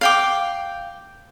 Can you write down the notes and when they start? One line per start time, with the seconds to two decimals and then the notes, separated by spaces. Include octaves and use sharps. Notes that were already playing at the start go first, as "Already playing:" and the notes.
0.01 F5 G5 D6